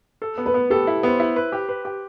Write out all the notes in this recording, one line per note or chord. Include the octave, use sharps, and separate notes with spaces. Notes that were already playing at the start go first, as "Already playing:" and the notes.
A4
B3
B4
B3
G4 A4
E4
B3 C5
E4
B4
G4
B4
G4